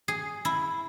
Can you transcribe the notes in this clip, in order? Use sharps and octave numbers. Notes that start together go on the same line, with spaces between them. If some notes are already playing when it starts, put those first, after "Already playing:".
G#4
E4